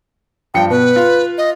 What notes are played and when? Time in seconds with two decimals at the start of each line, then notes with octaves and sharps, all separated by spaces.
0.54 G2 F3 G5 C#7
0.70 B2 B4
0.96 F4
1.38 D#5